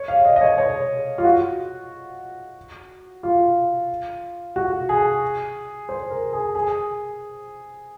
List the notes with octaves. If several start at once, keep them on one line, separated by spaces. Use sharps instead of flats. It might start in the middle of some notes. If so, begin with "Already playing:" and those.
Already playing: C#5
F5
D#5
D#5
C#5
C#5
F4
F#4
F4
F#4
G#4
C5
A#4
G#4
G#4